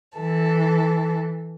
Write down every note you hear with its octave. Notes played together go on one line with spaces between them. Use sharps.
E3 A4